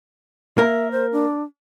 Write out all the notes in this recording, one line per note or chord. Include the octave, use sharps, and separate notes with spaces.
A#3 A#4 E5
C5
D4